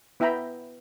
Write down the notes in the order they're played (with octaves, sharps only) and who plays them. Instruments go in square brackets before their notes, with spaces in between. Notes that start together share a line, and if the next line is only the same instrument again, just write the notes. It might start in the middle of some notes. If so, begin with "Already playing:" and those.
[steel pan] B3 E4 E5 G5 A#5 B5